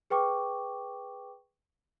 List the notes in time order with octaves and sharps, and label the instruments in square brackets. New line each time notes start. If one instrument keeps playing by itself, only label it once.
[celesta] G#4 B4 G5 C#6 D6